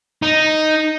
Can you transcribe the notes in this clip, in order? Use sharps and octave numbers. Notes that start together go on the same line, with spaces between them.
D#4